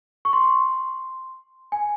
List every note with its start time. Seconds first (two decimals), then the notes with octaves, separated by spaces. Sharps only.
0.25 C#6
0.33 C6
1.72 G#5